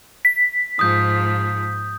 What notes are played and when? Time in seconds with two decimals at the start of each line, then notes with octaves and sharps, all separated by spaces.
0.25 B6
0.79 G#2 F3 D#6 G6